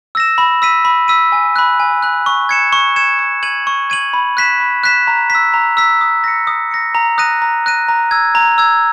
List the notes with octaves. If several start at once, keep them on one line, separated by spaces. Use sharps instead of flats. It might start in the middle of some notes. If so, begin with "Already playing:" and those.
E6 A#6 E7
B5
E6 B6 D#7
B5
E6 B6 D#7
G#5
B5 F#6
G#5
B5 F#6
C#6
G#6 C#7 E7
C#6
G#6 C#7 E7
C#6
G#6 D#7 F#7
C#6
G#6 D#7 F#7
B5
F#6 B6 E7
B5
F#6 B6 E7
A#5
E6 B6
A#5
E6 B6
D#6
A#6 C#7
D#6
A#6 C#7
A#5
D#6 F#6 A#6 D#7
A#5
D#6 F#6 A#6 D#7
A#5
E6 G#6
A#5
E6 G#6